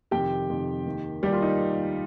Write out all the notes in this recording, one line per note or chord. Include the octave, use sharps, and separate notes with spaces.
F2 C3 D#3 G4 G5
F2 C3 D#3
D#2 D#3
D#2 D#3 G3 G4
F4
D#4